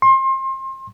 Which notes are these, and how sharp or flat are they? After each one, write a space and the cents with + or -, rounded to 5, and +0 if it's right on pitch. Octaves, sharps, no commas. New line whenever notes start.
C6 +30